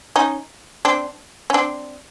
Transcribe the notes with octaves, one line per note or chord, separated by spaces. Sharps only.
C#4 D#4
C4 D4
C#4
C4 D4